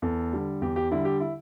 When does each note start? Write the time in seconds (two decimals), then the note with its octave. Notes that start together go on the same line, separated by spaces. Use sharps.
0.02 E2 A4
0.33 D3 G3
0.62 E2 G4
0.76 G4
0.92 D3 G3 E4
1.05 G4
1.20 E4